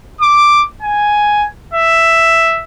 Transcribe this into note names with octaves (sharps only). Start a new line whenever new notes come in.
D6
G#5
E5